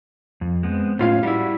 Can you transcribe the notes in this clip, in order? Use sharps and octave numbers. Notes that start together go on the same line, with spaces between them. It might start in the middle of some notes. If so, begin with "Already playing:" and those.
F2
G#3 B3 C4
B1 A2 C#4 F4 F5
G3 E4 F#4